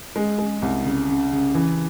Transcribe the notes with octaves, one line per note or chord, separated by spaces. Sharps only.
G#3
G#3
C2
C#3
C#3
C#3
E3